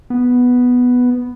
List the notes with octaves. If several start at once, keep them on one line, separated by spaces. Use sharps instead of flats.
B3